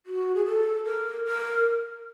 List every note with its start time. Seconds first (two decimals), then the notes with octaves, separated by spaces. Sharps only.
0.06 F#4
0.35 G#4
0.46 A4
0.85 A#4
1.25 A#4